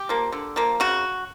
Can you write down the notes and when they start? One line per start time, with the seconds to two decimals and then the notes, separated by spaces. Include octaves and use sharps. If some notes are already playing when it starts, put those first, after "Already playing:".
Already playing: G4
0.09 F3 A#3
0.32 D3
0.56 F3 A#3
0.80 C#3 F#4